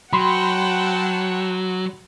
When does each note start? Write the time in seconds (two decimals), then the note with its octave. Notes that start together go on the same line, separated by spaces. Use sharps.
0.13 F#3 F#5 G5 A5 B5 C6